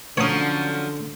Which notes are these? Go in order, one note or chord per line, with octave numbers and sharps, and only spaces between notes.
D3 F3 F#3 C#4 C#5 D#6